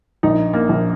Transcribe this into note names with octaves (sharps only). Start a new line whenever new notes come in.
A#1 D#4
A#3
A#1